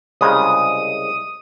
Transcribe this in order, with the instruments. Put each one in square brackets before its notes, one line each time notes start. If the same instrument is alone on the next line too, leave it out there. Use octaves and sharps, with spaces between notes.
[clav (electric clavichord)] C2 C#3 G#3 [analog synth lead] D#6